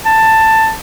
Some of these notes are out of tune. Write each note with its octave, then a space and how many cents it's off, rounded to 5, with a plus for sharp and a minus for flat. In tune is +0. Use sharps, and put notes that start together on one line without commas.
A5 +10